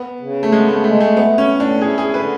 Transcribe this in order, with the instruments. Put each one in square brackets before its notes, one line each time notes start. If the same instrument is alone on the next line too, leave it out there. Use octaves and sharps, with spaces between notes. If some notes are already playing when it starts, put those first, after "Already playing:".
Already playing: [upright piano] B3
[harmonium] C#3
[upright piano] A3
[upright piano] G#3 [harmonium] B3
[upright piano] A3
[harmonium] G#3 [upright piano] A3
[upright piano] A3
[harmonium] A3 [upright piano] B3
[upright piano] C#4
[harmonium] A2
[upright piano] D4
[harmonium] E4 [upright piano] G#4
[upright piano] G#4
[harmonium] D3 [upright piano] B4